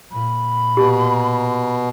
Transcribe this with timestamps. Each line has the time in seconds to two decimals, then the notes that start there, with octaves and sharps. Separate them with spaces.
0.11 A#2 B5
0.77 B2 G4